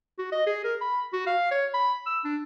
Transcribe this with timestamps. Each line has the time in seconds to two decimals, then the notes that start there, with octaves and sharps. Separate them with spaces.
0.19 F#4
0.32 D#5
0.47 G#4
0.65 A#4
0.81 B5
1.13 F#4
1.27 F5
1.51 C#5
1.74 B5
2.07 E6
2.25 D4